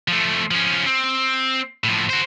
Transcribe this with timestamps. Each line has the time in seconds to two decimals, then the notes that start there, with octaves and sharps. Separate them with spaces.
0.08 F3 A3
0.51 F3 C#4
0.86 C4
1.84 A2 F3
2.10 F#4 C5